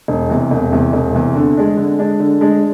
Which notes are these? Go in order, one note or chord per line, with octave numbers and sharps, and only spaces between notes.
E1
E2 C3
E1
E2 C3
E1
E2 C3
D3
G#3 D4
D3
G#3 D4
D3
G#3 D4